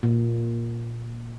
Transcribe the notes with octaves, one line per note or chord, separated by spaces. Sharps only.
A#2